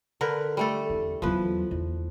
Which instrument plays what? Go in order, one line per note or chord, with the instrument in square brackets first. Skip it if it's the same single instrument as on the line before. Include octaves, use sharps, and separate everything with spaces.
[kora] D3 A#4 B4
G3 A3 A4
[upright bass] E2
[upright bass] E2 F#3 [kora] F3 B4
[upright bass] E2